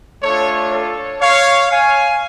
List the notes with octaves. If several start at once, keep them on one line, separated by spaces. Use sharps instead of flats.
A3 D4 F4 A4 C#5
A4 C#5
C#5 F5
F5 G#5